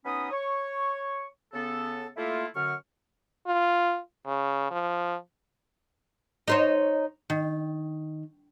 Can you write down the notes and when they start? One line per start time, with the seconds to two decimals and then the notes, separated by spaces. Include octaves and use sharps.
0.05 F#3 B3 C#4 D#4 B5 D#6
0.31 C#5 C#6
1.54 C#3 B3 A4
2.17 A3 A#3 E4 F4
2.55 F#2 D3 C#6 F6
3.47 F4
4.26 C#3
4.71 F3
6.48 D#4 C5 C#5
7.30 D#3